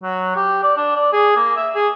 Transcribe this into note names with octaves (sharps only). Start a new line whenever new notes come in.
F#3
G4
D5
D4
D5
G#4
A#3
E5
G#4